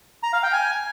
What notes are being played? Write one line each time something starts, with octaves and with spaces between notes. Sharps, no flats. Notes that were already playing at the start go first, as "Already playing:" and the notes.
A#5
F5
G5
G#5